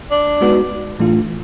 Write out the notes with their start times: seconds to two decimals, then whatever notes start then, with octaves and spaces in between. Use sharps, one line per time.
0.11 D4
0.41 G#3 B3 D#4 F#4 B4
0.99 A2 E3 A3 D4 F4